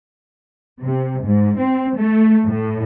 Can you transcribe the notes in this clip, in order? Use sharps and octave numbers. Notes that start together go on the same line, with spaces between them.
C3
G#2
C4
A3
A2